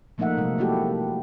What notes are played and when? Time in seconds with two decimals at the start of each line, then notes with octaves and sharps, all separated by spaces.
0.18 F3 A3 A#3 D#4 E5 F#5
0.37 C3 F#3 G#3
0.58 A3 A#3 E4 F#4 G4 A4